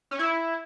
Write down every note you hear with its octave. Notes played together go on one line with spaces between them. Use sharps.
C#4
E4